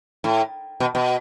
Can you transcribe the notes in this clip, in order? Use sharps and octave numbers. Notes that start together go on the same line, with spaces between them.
A2
B2
B2